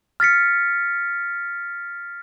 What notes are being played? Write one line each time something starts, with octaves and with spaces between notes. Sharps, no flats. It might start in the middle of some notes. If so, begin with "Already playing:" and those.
F6 A6 B6 C#7